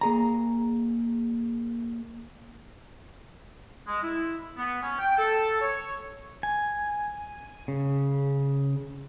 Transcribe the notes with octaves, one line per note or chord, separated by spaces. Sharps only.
A#3 G#4 A#5
G#3
E4
B3
C#4
G5
A4
C#5
G#5
C#3